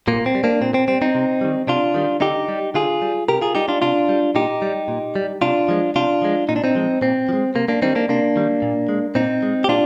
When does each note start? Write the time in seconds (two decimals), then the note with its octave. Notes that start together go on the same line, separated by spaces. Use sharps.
0.08 A#2 A#3
0.26 C4
0.35 G3
0.44 A#3 D4
0.61 A#2 C4
0.74 C4
0.88 G3 C4
1.02 C4 D#4
1.15 C3
1.41 D#3 G3
1.67 C3 D4 F4
1.94 D#3 G3
2.21 D3 D#4 G4
2.48 G3
2.74 D3 F4 G#4
3.02 G3
3.28 C3 G4 A#4
3.41 F4 G#4
3.55 G3 D#4 G4
3.68 D4 F4
3.82 C3 D4 F4
4.09 G3
4.35 A#2 D#4 G4
4.62 G3
4.88 A#2
5.16 G3
5.42 C3 D4 F4
5.68 F3 G#3
5.95 C3 D4 F4
6.22 F3 G#3
6.49 A#2 D#4
6.56 D4
6.64 C4 D#4
6.75 F3 G#3
7.02 A#2 C4
7.29 F3
7.33 G#3
7.55 C3 A#3
7.68 A#3 D4
7.82 D#3 G3 C4 D#4
7.95 A#3 D4
8.09 C3 A#3 D4
8.36 D#3 G3
8.62 A#2
8.89 G#3
9.15 A#2 C4 D#4
9.43 G#3
9.64 G4
9.69 A#2 D4 F4